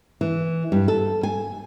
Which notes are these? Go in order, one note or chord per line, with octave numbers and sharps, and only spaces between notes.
E3
G2
A4
G#5